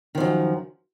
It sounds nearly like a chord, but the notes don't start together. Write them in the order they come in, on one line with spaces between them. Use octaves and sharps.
D#3 F3 F#2